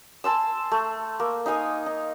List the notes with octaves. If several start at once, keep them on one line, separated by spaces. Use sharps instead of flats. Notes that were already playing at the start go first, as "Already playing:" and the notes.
G#5 A5 C6 E6
A3
A#3
D#4 F5 G#5 D#6
D#4